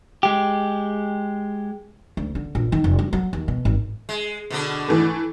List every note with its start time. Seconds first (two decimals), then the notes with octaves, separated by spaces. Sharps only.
0.23 G#3 G4
2.17 D2
2.35 D3
2.55 A#1
2.72 D#3
2.84 F1
2.99 G2
3.13 F#3
3.33 D#2
3.48 B2
3.65 G#1
4.09 G#3
4.50 B2 D3 D4
4.88 E3 A3